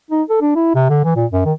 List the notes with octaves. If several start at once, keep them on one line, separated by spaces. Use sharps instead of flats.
D#4
A4
D4
E4
C3
D3
E3
A#2
F#2
D#3